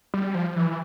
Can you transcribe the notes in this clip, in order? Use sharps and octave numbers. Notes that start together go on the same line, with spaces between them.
G3
F3
E3